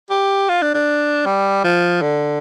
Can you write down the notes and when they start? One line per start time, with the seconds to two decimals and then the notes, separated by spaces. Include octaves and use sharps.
0.10 G4
0.49 F4
0.62 D4
0.74 D4
1.26 G3
1.64 F3
2.02 D3